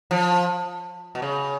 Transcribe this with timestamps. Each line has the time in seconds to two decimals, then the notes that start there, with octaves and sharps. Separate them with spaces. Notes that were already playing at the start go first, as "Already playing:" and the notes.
0.11 F3
1.15 B2
1.22 C#3